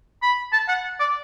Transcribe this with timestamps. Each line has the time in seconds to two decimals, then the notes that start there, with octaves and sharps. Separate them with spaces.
0.22 B5
0.53 A5
0.68 F#5
1.00 D5